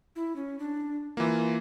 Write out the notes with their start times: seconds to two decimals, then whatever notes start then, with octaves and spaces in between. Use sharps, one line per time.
0.16 E4
0.36 C#4
0.59 D4
1.17 E3 A#3 F4